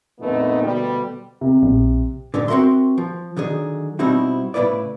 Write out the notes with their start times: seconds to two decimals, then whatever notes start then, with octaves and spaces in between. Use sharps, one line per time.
0.20 F2 A#2 D3 A3 B3 D#4
0.62 D2 B2 D3 G3
1.41 C3
1.63 A#1
2.34 G2 A#2 D3
2.48 C4 F#4 A#4 E5 C6
2.98 F3
3.37 D3 D#3 F#3 G#4
3.99 B2 G3 C4 D#4 E4 F#4
4.54 A2 C#3 E3 E4 B4 D5